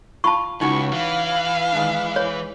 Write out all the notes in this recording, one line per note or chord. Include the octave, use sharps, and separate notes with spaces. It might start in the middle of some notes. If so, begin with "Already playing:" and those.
F4 A5 B5 C#6
C#2 C#4 D#4 E4 F#4 C#6
E3 F5
D#3 G#3 D4
C#5